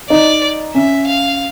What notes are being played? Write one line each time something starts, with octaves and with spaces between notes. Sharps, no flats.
D#4 D5
C#4 E5
F5